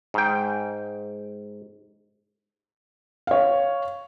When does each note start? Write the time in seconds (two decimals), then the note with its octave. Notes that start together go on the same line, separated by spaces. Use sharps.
0.14 G#2 G5
3.27 C#5 F5